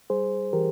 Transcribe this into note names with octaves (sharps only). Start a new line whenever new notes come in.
G3 G#4 C5
E3 G4 A#4